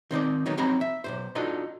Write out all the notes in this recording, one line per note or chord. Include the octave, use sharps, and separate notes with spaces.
D#3 C4 D#4 D5
D#3 F#3 A3 B3 D#4
F3 F#3 C4 D#4 A#5 B5
E5
B1 F#2 C5
D4 D#4 F4 F#4 A4 D#5